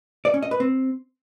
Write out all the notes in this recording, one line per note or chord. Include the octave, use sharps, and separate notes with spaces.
D5
C#4
D#5
B4
C4